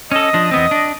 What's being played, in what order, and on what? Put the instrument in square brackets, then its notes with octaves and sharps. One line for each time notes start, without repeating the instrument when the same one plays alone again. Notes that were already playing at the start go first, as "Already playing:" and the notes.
[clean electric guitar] C#4 A4 [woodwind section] D#5
[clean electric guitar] F3 D4
E2 B3 C4
D4